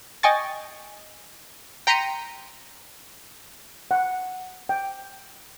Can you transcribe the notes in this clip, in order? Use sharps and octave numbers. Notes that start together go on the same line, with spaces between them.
D#5 G5 G#5 C#6 A6
G5 A#5 C6 B6 C#7 D#7
F#5
G5